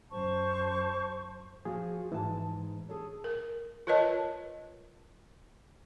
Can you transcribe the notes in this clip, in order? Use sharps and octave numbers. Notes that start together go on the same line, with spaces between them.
F#2 C5 A5 C#6
F3 F#4 G#4
G#2 E3 A5
G#4 A4 C#5
A#4
F4 A#4 B4 C#5 D#5 A5